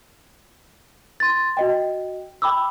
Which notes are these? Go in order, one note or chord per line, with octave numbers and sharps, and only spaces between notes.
C6 A6
F#4 D#5 G5
G5 B5 D6 E6